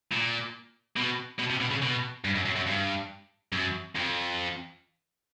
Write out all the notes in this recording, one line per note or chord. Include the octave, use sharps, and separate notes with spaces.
A#2
B2
B2
C3
B2
C#3
B2
G2
F#2
F#2
F#2
G2
F#2
F2